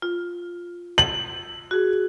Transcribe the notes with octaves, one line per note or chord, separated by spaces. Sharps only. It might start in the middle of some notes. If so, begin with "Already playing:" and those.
F4
F#7
F#4 G#4